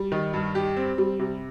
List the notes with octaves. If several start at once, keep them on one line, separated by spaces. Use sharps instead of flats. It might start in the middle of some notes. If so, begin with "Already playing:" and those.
Already playing: G3
D#3
G2
G4
C4
G3
C3